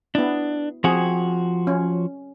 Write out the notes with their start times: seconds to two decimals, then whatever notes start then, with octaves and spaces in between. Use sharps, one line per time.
0.15 B3 D4 E4
0.84 F3 C4 F#4 G#4
1.67 C#4